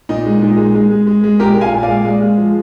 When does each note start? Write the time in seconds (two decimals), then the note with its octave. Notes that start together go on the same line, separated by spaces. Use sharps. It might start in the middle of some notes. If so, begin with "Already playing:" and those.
0.09 A#2 D#4
0.26 G#3
0.42 A#2
0.58 G#3
0.75 G#3
0.90 G#3
1.07 G#3
1.24 G#3
1.39 A#2 G4 A#4
1.57 A#2 F5 G#5
1.73 A#2
1.83 D5 F5
1.88 G#3
2.05 G#3
2.21 G#3
2.38 F3